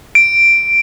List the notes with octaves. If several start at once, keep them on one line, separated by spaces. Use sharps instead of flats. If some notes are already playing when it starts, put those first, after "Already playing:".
D7